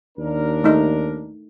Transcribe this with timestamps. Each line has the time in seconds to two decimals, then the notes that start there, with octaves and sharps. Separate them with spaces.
0.17 D#2 D4 A#4
0.64 A3 D#4